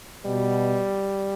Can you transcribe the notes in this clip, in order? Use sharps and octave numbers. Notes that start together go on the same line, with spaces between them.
B2 G3